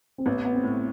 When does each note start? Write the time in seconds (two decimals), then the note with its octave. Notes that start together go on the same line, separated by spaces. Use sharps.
0.18 C4
0.26 A1 B3
0.45 B3
0.55 C4
0.63 A2